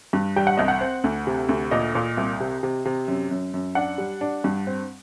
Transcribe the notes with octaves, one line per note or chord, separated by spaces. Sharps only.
G2
G3 G5
F#5
C2 D#5
F#5
C4
D2
C3
D2
A#2 D#5
A#2
C2
C3
C3
C3
F#2
F#2
F#2
D4 F#5
G3
D4
G2
C4